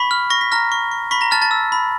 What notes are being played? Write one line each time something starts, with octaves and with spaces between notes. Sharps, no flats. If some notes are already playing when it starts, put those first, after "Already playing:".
Already playing: B5 C#6 B6
F6
C#6 A#6
B6
A#5 F6 A#6
C#6
C#6
B5 C#6 B6
A#5 A#6
A5 F6 A6
A5 A6
E6
B5